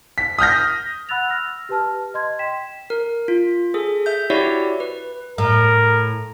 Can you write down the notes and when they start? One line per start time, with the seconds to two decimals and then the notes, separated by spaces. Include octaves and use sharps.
0.18 B6
0.39 D#6 F6 G6 A#6
1.09 F#5 B5 E6 F#6 A6 F7
1.29 E6 F6 A#6
1.69 G4 B4 A5 F6
2.14 D#5 C6 G#6
2.39 G5 B6 E7
2.90 A#4
3.28 F4
3.74 G#4 A4
4.06 E5 G6
4.30 E4 F#4 G4 C#5 D5 E5
4.80 B4
5.38 A2 A#4